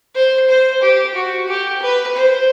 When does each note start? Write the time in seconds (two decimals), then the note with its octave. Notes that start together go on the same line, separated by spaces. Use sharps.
0.15 C5
0.49 C5
0.82 G4
1.15 F#4
1.48 G4
1.82 B4
2.16 C5